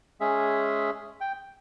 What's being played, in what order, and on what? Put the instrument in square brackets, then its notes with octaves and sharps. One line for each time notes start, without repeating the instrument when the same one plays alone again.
[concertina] G#3 C#4 G#4 E5
G5